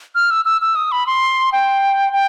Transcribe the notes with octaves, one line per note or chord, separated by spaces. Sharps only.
F6
E6
E6
E6
D#6
B5
C6
G5
G5